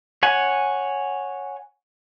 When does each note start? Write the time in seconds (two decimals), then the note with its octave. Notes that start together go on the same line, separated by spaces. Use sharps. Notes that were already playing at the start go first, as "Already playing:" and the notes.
0.23 C#5 F#5 G#5